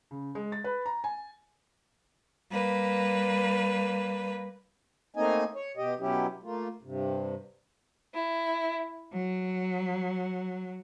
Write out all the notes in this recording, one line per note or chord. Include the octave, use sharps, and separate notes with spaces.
C#3
G#3
A6
B4
A#5
G#5
G3 A#3 B4
A3 A#3 C4 D#4 D#5 G#5
C#5
B2 G4 D#5
B2 F#3 C#4 E4 G4
A3 A#3 F4
G2 C3
E4
F#3